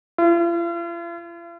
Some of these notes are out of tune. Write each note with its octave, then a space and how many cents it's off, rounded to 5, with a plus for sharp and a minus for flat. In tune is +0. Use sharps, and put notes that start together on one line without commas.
F4 -45